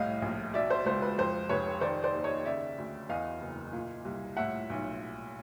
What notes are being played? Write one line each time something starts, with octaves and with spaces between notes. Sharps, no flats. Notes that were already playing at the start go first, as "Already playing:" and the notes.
Already playing: C2 A2 D#5 F5
A#1
B2 D5 E5
C5
C#2 C5
B4
F2 C5
F1 B4 C#5
D#3 C5 D5
C5 D5
D#2
C#5 D#5
C#3 D5 E5
D2
E2 D#5 F5
F#1
A#2
C2
A2 E5 F#5
B1